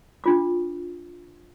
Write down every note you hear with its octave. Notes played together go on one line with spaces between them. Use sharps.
D4 F4 D6